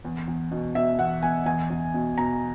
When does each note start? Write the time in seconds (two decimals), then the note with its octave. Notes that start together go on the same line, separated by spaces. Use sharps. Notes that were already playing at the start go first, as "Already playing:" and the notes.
0.05 E2
0.28 E2
0.51 B2
0.75 B2 E5
0.99 E2 F#5
1.23 E2 G#5
1.46 E2 G#5
1.70 E2
1.94 B2
2.18 B2 A#5